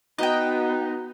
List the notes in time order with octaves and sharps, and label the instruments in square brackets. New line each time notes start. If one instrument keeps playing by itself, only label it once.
[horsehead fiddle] B3 [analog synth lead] D#4 [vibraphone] F#4 [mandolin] D#5 G5